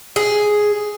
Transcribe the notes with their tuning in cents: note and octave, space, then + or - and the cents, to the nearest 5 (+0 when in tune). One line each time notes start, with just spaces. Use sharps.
G#4 +5